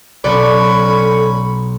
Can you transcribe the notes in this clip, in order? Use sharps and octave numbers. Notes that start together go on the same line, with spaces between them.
B1 C#4 A4 B4 C#5 D5 B5 C#6